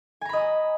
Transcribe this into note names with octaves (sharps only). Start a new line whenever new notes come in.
D#5 G#5 A#5 B5 D#6